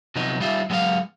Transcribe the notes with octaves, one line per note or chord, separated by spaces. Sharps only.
C3 F3 F#3 B3 D#4
G3 D#4 F4 E5
F#3 G#3 B3 D#5 F5